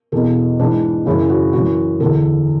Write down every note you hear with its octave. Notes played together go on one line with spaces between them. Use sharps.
E2 B2 A4
G#2 E3 D4
F#2 C#3 E3 E4
F#4
F#2 E3 F#4
E2 D3 A4